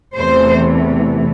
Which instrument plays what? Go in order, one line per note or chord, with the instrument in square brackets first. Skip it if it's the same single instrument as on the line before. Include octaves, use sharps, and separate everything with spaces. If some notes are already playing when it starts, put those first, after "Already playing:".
[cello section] E2 C3 E3 A3 C5